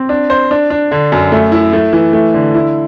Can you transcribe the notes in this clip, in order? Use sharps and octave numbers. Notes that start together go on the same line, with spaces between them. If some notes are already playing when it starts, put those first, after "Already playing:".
Already playing: C4
D4
C5
D4
D4
D3
F#2
A3
E4
A3
E3
A3
D3
E4